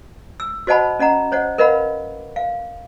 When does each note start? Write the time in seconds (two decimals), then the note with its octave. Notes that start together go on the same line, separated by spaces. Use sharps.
0.40 E6
0.67 F#4 C5 D#5 F#5 A5 B5
0.99 C#4 D#5 F#5 A#5
1.32 C5 C#5 D#5 F#5
1.58 A#4 B4 D#5 F5 F#5 B5
2.36 F5